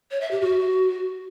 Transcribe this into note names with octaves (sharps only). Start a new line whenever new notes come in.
C#5
E5
G4
F#4